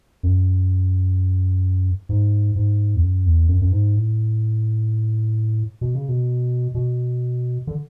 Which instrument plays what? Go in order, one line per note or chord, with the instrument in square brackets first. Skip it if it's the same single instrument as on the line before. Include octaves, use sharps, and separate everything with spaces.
[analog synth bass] F#2
G#2
G#2
E2
F#2
E2
F#2
F#2
G#2
A2
B2
C#3
B2
B2
D3